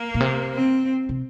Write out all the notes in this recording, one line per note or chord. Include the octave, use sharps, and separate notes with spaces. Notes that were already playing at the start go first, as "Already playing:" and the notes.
Already playing: A#3
A#2
C3
C4
C3